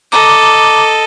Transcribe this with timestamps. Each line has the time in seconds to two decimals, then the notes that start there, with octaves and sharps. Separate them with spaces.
0.12 A4 D#5 A#5 D6